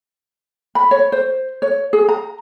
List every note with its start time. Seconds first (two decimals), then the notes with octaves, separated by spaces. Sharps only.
0.75 B5
0.91 C#5
1.12 C5
1.62 C#5
1.93 G#4
2.09 A#5